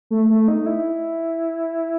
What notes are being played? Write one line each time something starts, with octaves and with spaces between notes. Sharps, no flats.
A3
A3
D#4
E4